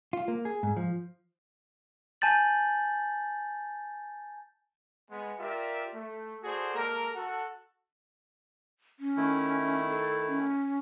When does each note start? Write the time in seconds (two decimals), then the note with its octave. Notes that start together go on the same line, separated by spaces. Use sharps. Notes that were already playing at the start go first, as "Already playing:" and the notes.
0.13 F4
0.28 A#3
0.45 G#4
0.63 G#2
0.77 F3
2.21 G#5 A5 G6 A6 F#7
5.11 G#3 B3
5.40 F4 G4 A#4 D5 E5
5.94 A3
6.44 F#4 G#4 A4 C5 D5 F#5
6.75 G#3 A#3 A4 A#4
7.15 F#4 A4 F#5
8.99 C#4
9.17 D#3 A3 E4
9.90 A4
10.28 C#4